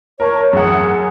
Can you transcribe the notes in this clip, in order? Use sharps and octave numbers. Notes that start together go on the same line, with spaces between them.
A#4 C#5 A5
F#2 G#4 F#5